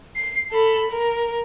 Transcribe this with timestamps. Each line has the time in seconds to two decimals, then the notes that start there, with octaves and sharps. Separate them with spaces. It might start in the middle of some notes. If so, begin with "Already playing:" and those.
0.16 C7
0.52 A4 B5
0.91 A#4